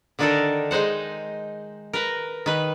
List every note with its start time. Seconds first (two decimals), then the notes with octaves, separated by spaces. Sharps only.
0.19 D3 D#3 D4 D#4 A4 A#4
0.71 G#3 D#4 C5 F#5
1.93 A#4 B4
2.46 D#3 B4